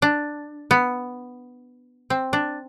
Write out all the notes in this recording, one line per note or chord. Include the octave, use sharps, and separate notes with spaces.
D4
B3
C4
D4